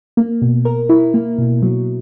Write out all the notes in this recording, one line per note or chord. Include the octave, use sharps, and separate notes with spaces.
A#3
B2
A#4
E4
A#3
B2
F#3